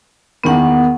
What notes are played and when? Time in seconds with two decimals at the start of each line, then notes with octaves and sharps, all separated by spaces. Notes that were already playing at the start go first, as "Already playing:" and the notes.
0.44 E2 D#3 A#3 B3 F#5